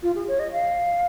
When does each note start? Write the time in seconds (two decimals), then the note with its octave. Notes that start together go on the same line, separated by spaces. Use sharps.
0.03 F4
0.15 G#4
0.28 C#5
0.39 D#5
0.52 F5